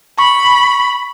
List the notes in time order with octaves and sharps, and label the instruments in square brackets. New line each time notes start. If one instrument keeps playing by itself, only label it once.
[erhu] B5 [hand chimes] C#6